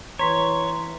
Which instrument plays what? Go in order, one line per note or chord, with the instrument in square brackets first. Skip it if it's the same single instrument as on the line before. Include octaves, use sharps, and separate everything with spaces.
[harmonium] E3 [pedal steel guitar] C#5 [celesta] A#5 C6 B6